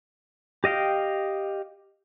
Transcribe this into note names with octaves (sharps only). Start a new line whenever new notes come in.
G4 D#5 F5 G5